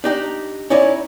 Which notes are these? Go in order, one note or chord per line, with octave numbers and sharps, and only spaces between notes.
D4 D#4 G4
C#4 D#4 E4 C#5 D5